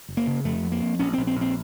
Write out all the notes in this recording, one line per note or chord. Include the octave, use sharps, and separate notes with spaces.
F#1
A#3
C#3
F2 A3
F2
A#3
F2
A#1 C#4
A#1 C4
C4
A#1
C4